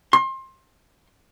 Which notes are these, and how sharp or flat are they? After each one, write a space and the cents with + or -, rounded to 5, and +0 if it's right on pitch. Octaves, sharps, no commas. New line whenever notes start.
C6 +25